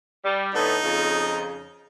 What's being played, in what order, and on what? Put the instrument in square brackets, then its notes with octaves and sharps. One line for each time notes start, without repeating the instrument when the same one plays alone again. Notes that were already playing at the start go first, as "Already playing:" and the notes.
[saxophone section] G3
[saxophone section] A2 D3 B3 [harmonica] D#4
[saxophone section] F2 C#3